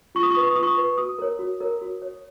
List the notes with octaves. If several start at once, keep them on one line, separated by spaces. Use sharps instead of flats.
F4 C#6
D#6
C#6
B4 D#6
C#6
F4 D#6
C#6
B4
F#4 D#6
A#4 C#5
F#4
A#4 C#5
F#4
C#5